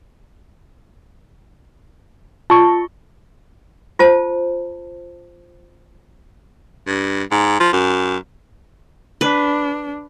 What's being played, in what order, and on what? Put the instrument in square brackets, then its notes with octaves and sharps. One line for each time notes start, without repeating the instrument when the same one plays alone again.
[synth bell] F4 [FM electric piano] A5 C#6
[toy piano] F4 C5 A5
[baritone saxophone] G2
G#2
F3
F#2
[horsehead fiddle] D4 [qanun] B4